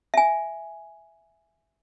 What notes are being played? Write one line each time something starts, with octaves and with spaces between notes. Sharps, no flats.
E5 G#5